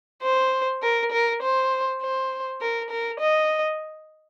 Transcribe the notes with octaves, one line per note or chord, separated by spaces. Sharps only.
C5
A#4
A#4
C5
C5
A#4
A#4
D#5